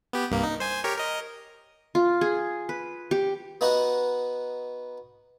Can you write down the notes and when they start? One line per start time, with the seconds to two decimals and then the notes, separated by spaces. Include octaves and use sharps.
0.13 B3 G4
0.30 C2 G2 A#3
0.43 D#4
0.60 C5 G#5
0.84 G4 A#4 C#5
0.98 A#4 D#5
1.95 F4
2.21 G#4
2.69 B4
3.11 G4
3.61 B3 D#4 F#4 D#5 F#5